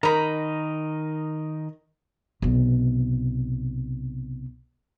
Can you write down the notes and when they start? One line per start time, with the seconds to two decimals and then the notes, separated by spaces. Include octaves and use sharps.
0.03 D#3 D#4 A#4 A#5 B5
2.42 B1 C3